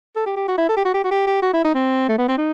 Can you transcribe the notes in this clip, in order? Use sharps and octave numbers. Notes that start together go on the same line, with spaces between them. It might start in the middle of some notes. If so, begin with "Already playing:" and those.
A4
G4
G4
F#4
E4
A4
G4
F#4
G4
F#4
G4
G4
F#4
E4
D#4
C4
A3
B3
C4
D#4